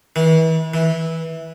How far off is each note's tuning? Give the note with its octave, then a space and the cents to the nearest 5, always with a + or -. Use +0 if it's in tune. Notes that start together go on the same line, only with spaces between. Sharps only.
E3 -35
E3 -15